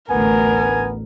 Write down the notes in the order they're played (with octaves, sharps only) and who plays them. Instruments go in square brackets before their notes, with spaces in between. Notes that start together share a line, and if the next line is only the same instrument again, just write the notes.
[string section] A1 D2 [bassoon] B3 [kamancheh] A#4 [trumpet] G#5